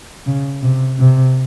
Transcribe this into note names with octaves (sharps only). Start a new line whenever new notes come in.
C#3
C3
C3